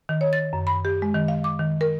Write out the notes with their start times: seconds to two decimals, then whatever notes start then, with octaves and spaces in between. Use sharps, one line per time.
0.09 D#3
0.21 C#5
0.33 A6
0.53 F#2
0.67 B5
0.85 G4
1.02 G#3
1.14 D#3
1.28 F5
1.44 D6
1.59 D#3
1.81 A#4